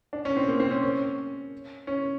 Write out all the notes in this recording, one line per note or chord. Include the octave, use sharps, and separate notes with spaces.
D4
C#4
C4
A#3
C4
C#4
C#4
C#4